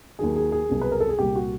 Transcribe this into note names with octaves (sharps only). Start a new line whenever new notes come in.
D#2 D#3 F#3 G#4
G#4
G#4
C2 B2 F#3
B4
A#4
A4
G#4
C2 A#2 G3 G4
F#4